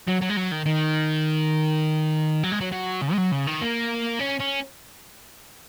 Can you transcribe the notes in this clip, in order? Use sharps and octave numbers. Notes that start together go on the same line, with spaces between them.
F#3
F#3
G#3
F#3
D#3
D#3
F#3
G#3
F#3
F#3
C#3
G#3
F#3
C#3
D#3
A#3
C#4
C#4